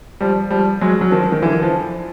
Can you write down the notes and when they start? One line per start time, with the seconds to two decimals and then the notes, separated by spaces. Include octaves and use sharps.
0.21 F3 G3
0.50 F3 G3
0.81 F#3 G#3
1.01 F#3
1.11 D#3 F3
1.32 D#3
1.42 D3 E3
1.62 F3